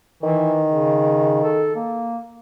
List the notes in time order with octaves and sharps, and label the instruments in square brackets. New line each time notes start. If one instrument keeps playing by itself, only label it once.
[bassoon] D#3 [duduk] E3
[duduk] C#3
A4
A#3